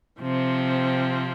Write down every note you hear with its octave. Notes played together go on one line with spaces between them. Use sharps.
C3 F3 C4